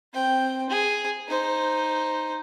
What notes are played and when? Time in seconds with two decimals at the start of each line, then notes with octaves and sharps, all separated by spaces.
0.13 C4 G5
0.70 G#4
1.28 D#4 C5